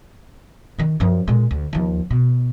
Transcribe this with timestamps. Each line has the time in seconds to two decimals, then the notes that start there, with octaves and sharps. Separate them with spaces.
0.78 D#3 D#4
1.00 F#2 F3
1.28 A#2 G#3
1.51 D2
1.73 D#2 F3
2.11 B2